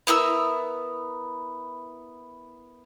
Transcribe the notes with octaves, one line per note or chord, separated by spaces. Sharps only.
B3 E4 A#4 E6